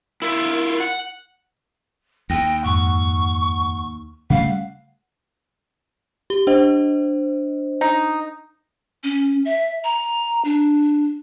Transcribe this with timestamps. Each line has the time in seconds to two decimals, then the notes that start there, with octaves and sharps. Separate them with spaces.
0.22 E4 F4 A#4
0.80 F#5
2.30 D#2 G5 A#6
2.63 F2 G#2 F#5 C#6
4.30 C#3 G3 A3 F5 F#5
6.30 G4 G7
6.47 D4 C5 D#5
7.81 D#4
9.04 C#4
9.45 E5
9.84 A#5
10.45 D4